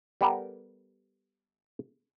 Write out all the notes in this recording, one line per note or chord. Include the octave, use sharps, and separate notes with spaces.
G3 B3 G4 A4 A#4